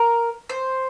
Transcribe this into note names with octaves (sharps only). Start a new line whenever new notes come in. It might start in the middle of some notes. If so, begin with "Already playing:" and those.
Already playing: A#4
C5